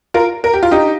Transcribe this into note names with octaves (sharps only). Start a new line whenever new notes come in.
F4 A#4
A#4
G4
F4
D#4 G4